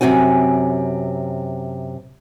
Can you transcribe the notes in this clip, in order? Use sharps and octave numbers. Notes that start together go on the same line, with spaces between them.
F#2 C3 C4 F#4 G#5